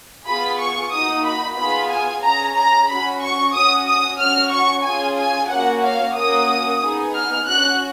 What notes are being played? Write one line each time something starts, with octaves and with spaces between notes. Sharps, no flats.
B3 F4 G#4 B5
C#6
A#3 D#4 F#4 D#6
B5
B3 F4 G#4 B5
G#5
C#4 G#4 A#5
A#5
C#4 F#4 B5
C#6
C#4 F#4 D#6
D#6
C#4 F#4 F6
C#6
C#4 F4 G#4 G#5
G#5
A#3 C#4 F#4 F#5
F5
A#3 C#4 F#4 D#6
B3 D#4 G#4
F6
C#4 F#4 F#6